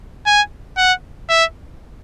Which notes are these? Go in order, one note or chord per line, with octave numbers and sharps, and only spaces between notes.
G#5
F#5
E5